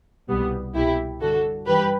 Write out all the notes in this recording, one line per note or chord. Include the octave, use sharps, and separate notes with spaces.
C2 B2 G3 B3
C2 B2 E4 G4
G2 D3 F#4 A4
G2 E3 G4 B4